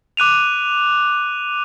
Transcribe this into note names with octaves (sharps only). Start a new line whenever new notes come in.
D6 F#6 D#7 F7